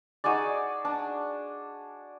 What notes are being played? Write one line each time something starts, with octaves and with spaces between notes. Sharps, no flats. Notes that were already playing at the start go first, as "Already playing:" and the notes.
D#4 F#4 G#4 D5
D4